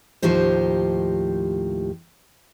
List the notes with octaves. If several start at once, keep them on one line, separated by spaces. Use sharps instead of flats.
D#2 A2 F3 D#4 G4 C5